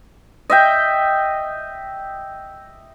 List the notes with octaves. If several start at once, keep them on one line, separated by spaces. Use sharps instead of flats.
D#5 E5 G5